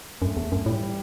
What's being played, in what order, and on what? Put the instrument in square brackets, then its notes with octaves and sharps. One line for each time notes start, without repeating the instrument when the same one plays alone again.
[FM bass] F#2 [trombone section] F#3 A3
[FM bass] E2
F#2
[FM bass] A2 [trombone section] E3 G3